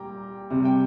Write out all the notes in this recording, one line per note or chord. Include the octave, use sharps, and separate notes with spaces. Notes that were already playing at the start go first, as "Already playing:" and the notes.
Already playing: A#2 G3 G5 A#5 D6
C3 G3
G5